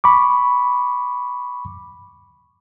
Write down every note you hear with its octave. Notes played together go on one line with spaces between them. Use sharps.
B5 C#6 D6